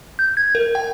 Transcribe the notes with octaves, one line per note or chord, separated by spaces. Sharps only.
G6
G#6
A#4
G5